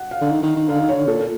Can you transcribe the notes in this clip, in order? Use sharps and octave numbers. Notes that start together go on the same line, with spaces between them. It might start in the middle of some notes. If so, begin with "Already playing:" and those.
Already playing: F#5
F5
D3
D#3
D#3
D#3
D3 F5
D#3
D3 C#5
A#2 A4